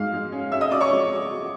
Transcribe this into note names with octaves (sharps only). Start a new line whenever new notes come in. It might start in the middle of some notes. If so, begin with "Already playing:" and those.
Already playing: G#2 G#3 F5 F6
G#3
C#4
C#4 E5 E6
D#5 D#6
C#4 D5 D6
C#5 C#6
G#3